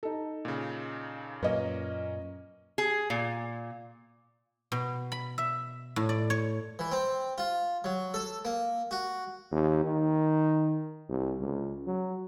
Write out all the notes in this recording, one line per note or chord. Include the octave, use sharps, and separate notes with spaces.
D#4 A4
A#2 C#3
F#2 A#2 A#3 C#4 B4 D#5
G#4
A#2
B2
B5
E5
A2
D5
C#5
E3
C4
F4
F#3
A4
A#3
F#4
D#2
D#3
C2
C#2
F#3